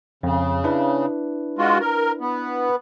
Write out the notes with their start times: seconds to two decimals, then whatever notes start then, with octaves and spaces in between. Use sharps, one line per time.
0.23 F2 C#3
0.64 D4 E4 B4
1.58 G#3 F4 F#4
1.80 A#4
2.21 B3